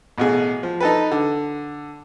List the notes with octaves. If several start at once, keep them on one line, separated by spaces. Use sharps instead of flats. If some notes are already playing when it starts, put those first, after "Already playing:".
A1 B2 G#4
F3
D#4 A4 B4
D3